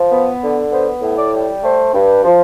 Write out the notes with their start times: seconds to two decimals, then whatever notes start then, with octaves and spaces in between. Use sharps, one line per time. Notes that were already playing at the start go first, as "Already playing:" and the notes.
Already playing: F3
0.11 B3
0.41 D3
0.71 B3 C5
1.02 A2
1.17 D5
1.32 G3
1.63 A3 C5
1.94 G2
2.24 F3